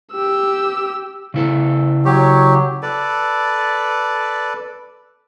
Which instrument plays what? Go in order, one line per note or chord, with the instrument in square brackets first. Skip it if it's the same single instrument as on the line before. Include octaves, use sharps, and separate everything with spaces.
[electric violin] G4 E6
[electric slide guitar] C#3 E4 A4
[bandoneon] F#3 G4 [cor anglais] C#5
[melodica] A4 B4 D5